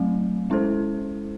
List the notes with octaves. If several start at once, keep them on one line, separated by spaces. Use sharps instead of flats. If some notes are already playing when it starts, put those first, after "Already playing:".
Already playing: F#3 A3 C4
G#3 C#4 E4 A4 C5